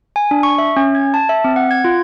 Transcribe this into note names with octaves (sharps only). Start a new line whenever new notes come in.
G#5
D4
C#6
E5
C#4
G#6
A5
E5
C4
F#5
G#6
F4